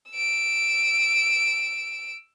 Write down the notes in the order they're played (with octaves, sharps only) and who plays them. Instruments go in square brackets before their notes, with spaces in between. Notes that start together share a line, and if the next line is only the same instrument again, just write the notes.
[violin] E6 D7